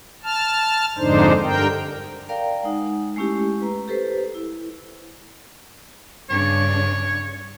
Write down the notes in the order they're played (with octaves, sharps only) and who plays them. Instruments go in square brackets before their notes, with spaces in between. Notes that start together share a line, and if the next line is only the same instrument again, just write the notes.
[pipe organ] A5 F6
F2 G#2 D3 D4 D#4 C5
G2 D3 A#4 G5
[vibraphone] A#4 D5 F5 G5 A#5
G#3 D#4 F#5
G#3 A3 C#4 E4 G4
B4 A#5
G4 A4 B4 C5
E4
[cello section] G2 C#3 D4 [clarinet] C#5